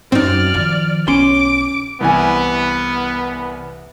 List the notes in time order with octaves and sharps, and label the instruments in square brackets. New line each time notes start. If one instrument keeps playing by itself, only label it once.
[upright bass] F#2 [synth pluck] C4 D#4 [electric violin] D5 F6
[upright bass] D#3 F3
[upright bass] B1 [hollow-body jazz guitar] C#4 C#5 C6 [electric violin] D6
[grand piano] C2 E3 G#5 [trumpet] B3